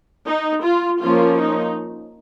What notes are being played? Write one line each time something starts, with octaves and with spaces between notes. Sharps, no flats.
D#4
F4
F3 A#3 C#4 F4
D#4